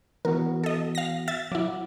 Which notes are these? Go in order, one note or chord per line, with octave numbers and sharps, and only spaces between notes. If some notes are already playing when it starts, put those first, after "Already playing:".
E3 B3 F#4 A#4
A4 D#5
F5 A#6
E5 A6
F#3 E4 F#5 D6